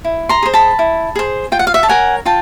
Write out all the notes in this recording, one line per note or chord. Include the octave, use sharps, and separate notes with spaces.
E4
A#5 C6
G#4 C5
A5 B5
E4
G#4 C5
F4 G5
F#5
F5
E5 F#5
A5
A#4 C#5 F#5 G#5
F4 G5 A5